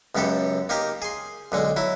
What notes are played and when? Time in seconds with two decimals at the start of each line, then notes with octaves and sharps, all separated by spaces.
0.15 C#2 F#2 B3 G4 A4
0.69 A#3 D#4 G4 A#4
1.02 G#4 C6
1.52 B1 D3 G#3
1.76 F#3 E4